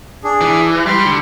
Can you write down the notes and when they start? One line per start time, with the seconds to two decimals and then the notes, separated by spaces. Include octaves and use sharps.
0.24 D4 G#4
0.41 E3
0.86 G3 B5 C6 F6
1.06 D3